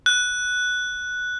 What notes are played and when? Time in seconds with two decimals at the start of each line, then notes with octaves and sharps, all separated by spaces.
0.06 F#6